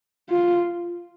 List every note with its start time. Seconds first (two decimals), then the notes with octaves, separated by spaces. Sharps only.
0.30 F4